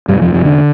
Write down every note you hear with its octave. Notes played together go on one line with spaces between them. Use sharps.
E2 G2 C3 G3
F2 F3
F2 F3
D3 D4